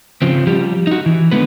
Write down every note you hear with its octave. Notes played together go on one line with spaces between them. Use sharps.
C#3 F3 C4
F3 G3 G4
D#4 F#4
E3
D3 G#3 B3 B4